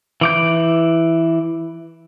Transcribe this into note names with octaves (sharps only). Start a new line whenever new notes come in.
E3 D6 G6